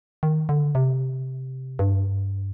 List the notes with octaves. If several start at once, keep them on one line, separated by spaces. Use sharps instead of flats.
D#3
D3
C3
G2